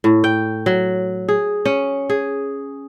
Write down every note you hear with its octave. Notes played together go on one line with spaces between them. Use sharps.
A2
G5
F#3
G#4
C#4
G#4